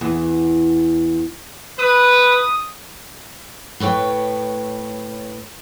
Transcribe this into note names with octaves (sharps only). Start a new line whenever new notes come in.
E2
B4 D#6
A2 B4 C#5 G5